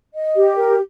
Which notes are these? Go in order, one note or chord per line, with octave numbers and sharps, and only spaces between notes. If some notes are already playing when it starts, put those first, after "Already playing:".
D#5
G4
A#4